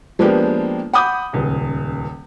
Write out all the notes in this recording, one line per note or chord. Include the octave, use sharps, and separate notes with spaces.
F3 G#3 A#3 B3 D4 G4
F#5 B5 D6 D#6 G6
D#1 C#2